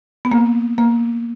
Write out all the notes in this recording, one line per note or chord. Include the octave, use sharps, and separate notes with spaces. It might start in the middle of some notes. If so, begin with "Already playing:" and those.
B3
A#3
A#3